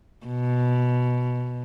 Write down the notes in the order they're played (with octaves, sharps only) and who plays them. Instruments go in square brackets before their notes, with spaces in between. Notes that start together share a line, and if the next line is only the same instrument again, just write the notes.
[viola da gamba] B2